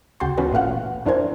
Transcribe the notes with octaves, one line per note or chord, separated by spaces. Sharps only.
D2 C#3 F#4 G5 A5 C6
E3 B3 C#4 F#4 B4
G#1 A#2 A3 F5 F#5
F2 D4 E4 A#4 C5 G#5